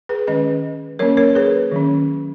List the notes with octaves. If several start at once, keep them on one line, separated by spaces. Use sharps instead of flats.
G#4 B4
D#3 G#3 C#4 B4 D#5
F#3 A#3 C#4 A#4 C#5
A#4 C#5
G#4 B4
D#3 F#3 C#4